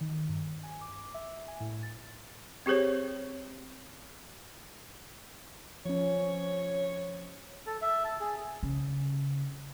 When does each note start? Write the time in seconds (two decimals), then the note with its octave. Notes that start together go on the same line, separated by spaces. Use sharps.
0.01 D#3
0.29 G2
0.63 G#5
0.81 D6
1.14 E5
1.26 E5
1.48 G#5
1.60 A2
1.83 A6
2.66 C4 G4 G#4 C5 C#5
5.85 F3 C#4 C#5
7.66 A4
7.82 E5
8.04 A5
8.20 G#4
8.63 C#3